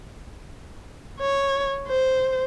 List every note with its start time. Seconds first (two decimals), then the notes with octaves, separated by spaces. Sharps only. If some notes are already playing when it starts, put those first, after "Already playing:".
1.21 C#5
1.89 C5